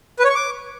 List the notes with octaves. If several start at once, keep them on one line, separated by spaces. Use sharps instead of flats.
B4
C#5
C#6
D6